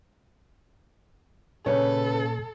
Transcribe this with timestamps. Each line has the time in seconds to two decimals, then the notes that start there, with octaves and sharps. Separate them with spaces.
1.66 A#2 C#3 A4 B4 C#5